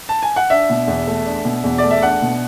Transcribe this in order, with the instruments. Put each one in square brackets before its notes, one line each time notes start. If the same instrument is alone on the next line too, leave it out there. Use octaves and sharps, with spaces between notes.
[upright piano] A5
G#5
F#5
[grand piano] D4 [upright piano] E5
[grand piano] B2
E2
A3
D4
B2
E2
[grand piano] A3 [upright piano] D5
[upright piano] E5
[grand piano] D4 [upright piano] F#5
[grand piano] B2